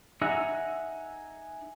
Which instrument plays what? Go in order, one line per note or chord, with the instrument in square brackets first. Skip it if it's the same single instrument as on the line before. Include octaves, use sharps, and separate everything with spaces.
[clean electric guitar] D#4 G#4 E5 F#5 A#5